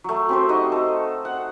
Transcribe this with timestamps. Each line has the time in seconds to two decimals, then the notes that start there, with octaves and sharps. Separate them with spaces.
0.04 F#3 A3
0.29 C4 G4 C5
0.49 D#4 F#4 D#5
0.72 A4
1.25 F#5